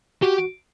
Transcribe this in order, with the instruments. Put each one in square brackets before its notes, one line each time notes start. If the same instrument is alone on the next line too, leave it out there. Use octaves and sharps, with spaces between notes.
[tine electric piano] F#4 [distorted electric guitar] G4